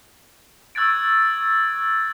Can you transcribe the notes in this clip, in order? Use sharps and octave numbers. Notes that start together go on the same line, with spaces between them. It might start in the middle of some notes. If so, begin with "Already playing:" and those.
C#6 E6 F#6 G#6 A6 D7